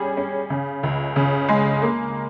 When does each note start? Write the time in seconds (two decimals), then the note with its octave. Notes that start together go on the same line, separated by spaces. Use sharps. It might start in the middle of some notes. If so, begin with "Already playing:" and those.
Already playing: G3 C#4 G#4
0.17 C#4
0.50 C#3
0.83 C#2
1.16 C#3
1.49 G#3
1.82 A#3